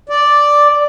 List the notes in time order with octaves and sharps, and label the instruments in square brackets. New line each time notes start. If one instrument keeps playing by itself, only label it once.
[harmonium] D5